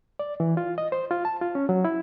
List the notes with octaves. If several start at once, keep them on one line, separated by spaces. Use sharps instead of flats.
D5
E3
F4
D#5
C5
F4
A5
F4
C#4
F#3
E4